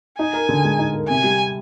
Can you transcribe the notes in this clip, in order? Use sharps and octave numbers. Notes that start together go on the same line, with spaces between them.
D#4 G#5
A#4
D3
G#3
D#4
A#4
C3 G#5
G3